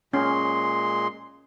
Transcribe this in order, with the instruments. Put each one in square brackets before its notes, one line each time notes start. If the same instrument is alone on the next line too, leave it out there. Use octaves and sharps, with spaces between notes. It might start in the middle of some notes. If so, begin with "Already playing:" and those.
[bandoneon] A#2 G#3 C6 [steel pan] C#4